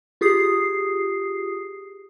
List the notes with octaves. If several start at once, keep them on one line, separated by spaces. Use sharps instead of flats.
F4 G4 G#4 D#6 C7